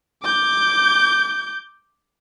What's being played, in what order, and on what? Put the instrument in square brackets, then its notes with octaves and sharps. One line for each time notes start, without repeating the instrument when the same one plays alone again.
[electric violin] D6 G6